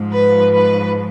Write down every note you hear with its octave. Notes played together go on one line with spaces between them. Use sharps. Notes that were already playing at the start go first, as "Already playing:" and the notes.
Already playing: G#2 F3
B4
B4